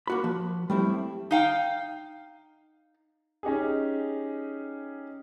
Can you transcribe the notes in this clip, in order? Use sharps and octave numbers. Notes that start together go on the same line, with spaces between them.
A#3 F#4 B5
F3
G3 A3 C4 E4
D#4 F5 G5
C#4 D#4 G4 G#4